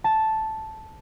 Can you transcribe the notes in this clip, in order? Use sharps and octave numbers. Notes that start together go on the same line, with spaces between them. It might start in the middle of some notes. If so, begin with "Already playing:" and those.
A5